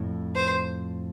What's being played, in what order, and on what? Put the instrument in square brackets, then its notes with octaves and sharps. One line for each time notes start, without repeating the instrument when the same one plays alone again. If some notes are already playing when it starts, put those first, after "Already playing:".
Already playing: [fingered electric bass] F2 A2
[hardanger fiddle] C5